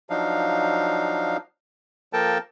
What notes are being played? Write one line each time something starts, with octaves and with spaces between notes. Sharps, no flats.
F3 F#3 D4 D#4 F5
F3 A#3 A4 A#4 G5 A5